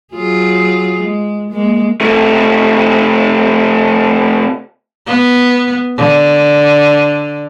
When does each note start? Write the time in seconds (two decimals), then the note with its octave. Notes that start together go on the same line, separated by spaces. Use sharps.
0.14 F#3 F4 G#4
1.03 G#3
1.51 G#3 A#3
2.01 C3 A3
5.06 B3
5.97 D3